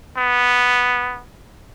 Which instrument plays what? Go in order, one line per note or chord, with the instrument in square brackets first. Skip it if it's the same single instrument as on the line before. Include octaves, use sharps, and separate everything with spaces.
[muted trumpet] B3